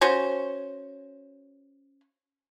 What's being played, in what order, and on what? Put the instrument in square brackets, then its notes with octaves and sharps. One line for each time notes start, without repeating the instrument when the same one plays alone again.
[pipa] C#4 F#4 C5